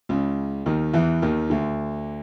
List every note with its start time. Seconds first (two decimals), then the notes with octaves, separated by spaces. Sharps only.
0.09 C#2 C#3
0.66 D#2 D#3
0.93 E2 E3
1.22 D#2 D#3
1.50 D2 D3